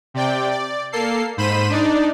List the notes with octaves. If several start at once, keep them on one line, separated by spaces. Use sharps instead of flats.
C3 D5 G5
D5
A#3 A4 C7
G#2 C5 B5 B6 D#7 E7
D4 D#4 D5